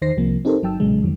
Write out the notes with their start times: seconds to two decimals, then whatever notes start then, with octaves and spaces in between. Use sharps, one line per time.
0.02 E2 D#3 D#4 C5 A#6 C7
0.17 C2 C3 F3 A#3
0.45 C4 D#4 G4 A4 A#4 C5
0.63 G1 F#3 D#4 G5 A5 E6
0.80 B1 A#2 C#3 F#3 G#3
1.02 F2 D#3 F#3